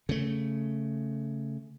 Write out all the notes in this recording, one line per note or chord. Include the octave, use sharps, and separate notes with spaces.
C#3 A3